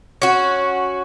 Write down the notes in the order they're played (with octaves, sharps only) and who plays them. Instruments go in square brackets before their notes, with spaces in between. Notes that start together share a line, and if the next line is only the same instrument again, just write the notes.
[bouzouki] C#4 F#4